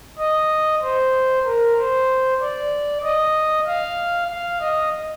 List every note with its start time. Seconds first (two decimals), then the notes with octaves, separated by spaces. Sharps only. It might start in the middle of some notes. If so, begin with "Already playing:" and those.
0.19 D#5
0.82 C5
1.45 A#4
1.77 C5
2.41 D5
3.04 D#5
3.67 F5
4.30 F5
4.61 D#5